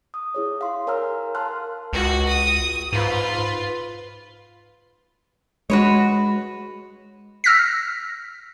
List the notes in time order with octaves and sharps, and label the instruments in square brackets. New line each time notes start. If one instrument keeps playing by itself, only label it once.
[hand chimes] D#6
E4 G#4 C#5
F5 C6
A#4 C#5 G#5 A#5 E6 F6
A#4 F5 A5 C6 F6 F#6
[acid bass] C#2 [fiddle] F#4
[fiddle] D#6
[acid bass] G#2 [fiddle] F4 B4
[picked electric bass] G#3 [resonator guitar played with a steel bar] F#4 B4 C#5
[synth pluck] E6 F6 A#6 B6